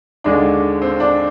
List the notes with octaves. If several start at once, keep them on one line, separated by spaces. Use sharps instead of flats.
D#2 D3 G#3 D4
C4
D4